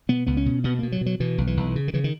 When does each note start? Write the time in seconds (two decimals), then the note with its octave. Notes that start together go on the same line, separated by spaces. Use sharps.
0.09 B2 B3
0.27 C#2 B3
0.37 C#4
0.46 B2
0.64 B2 B3
0.79 B2 A#3
0.92 F#3
1.01 B2
1.06 F#3
1.20 B2 E3
1.38 B1
1.47 E3
1.57 B1
1.76 C#3
1.88 D#3
1.94 C#3 E3
2.04 D#3